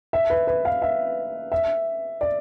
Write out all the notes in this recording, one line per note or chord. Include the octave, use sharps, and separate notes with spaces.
E5
B4
B4
F5
E5
E5
D5